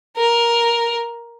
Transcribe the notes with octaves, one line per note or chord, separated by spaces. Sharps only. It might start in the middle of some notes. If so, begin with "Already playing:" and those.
A#4